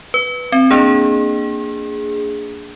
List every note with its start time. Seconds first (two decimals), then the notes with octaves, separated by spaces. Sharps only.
0.14 B4
0.52 C4
0.71 A#3 D4 G#4